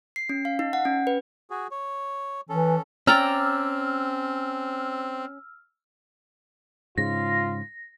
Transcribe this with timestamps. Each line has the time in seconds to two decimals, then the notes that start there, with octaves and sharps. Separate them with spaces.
0.16 C7
0.29 C#4
0.45 F5
0.59 D#4
0.73 F#5
0.85 C#4
1.07 B4
1.50 F#4 G#4
1.71 C#5
2.49 E3 C#4 A4
3.07 C4 C#4 D5 G5 A#5 E6 F6
6.98 G#2 C#3 F4 A#6